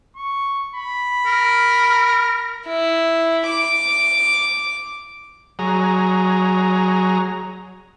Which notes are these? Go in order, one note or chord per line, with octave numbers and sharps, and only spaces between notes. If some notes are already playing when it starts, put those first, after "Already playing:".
C#6
B5
A#4
E4
D6
F#3 G#4 A#5